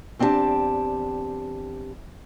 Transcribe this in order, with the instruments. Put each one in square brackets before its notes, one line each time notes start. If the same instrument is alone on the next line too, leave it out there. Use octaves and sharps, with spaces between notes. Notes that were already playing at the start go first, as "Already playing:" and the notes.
[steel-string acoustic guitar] E2 C4 D4 E4 G4 A5